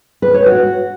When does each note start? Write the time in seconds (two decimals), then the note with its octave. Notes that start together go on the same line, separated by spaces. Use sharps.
0.22 B4
0.34 C#5
0.46 F#4